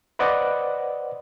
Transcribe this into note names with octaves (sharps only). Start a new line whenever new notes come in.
B4 C5 D5 D#5 F#5